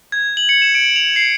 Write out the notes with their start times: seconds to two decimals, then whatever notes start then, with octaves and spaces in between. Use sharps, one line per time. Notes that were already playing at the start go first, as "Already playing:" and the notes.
0.12 G#6
0.37 F#7
0.49 C#7
0.62 E7
0.75 D7
0.96 F7
1.16 C7